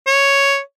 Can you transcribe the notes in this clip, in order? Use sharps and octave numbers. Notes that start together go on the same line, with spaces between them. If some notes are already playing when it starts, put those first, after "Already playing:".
C#5